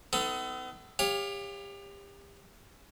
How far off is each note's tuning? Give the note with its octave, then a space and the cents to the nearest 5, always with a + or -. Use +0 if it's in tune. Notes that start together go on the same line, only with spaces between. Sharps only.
B3 +40 D#4 +35 A4 +10
G4 +30 C#5 +0 F5 +15